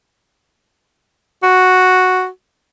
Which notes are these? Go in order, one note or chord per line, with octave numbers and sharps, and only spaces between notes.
F#4